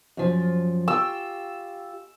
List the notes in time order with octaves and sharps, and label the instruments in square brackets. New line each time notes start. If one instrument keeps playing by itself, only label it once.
[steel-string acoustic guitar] F#2 F3
[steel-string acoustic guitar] F4 G4 [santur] E6